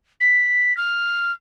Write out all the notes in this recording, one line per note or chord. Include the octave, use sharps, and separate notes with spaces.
B6
F6